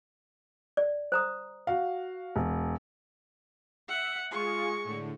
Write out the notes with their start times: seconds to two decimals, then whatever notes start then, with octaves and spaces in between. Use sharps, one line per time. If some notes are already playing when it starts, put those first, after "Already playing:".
0.77 D5
1.12 C5 A#5 D#6
1.67 F#4 F5
2.36 E1
3.88 E5 F#5
4.31 G#3 F4 G#4 C#6
4.84 A2 D3